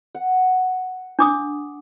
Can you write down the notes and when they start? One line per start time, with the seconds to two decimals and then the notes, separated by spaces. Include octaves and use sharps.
0.15 F#5
1.19 D4 D6 D#6